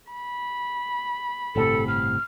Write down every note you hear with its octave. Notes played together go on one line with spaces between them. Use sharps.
B5
G1 A2 C3 A4
F6